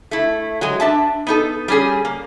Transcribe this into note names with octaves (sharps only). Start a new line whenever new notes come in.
A3 E4
F#3 G#3
D4 E5 A5
B3 D#4 A4
G3 C#4 G#4
A#3